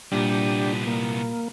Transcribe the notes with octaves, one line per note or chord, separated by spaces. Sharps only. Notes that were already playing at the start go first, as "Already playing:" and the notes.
C2 A#2 G3 B3 D4 G4
A#3